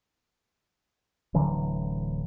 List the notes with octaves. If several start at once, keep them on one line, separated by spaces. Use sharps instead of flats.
D1 D3 E3 F#3